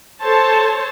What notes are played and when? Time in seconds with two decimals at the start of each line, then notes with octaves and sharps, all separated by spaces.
0.22 A4 C5 C#5 A5